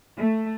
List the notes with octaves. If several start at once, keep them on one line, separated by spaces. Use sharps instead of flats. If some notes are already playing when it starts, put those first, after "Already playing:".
A3